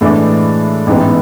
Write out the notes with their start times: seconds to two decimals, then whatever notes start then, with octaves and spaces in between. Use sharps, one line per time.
0.01 A2 E3 G#3 D4
0.87 A1 G#2 E3 G#3 B3